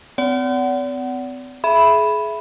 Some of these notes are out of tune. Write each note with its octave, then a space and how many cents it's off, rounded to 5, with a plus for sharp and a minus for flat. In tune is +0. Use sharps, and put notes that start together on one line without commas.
C4 -45 D5 -40 F#5 +20
G#4 +30 E5 +10 B5 +0